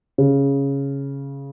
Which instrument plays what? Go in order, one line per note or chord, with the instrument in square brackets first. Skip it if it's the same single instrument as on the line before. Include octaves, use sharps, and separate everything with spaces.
[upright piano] C#3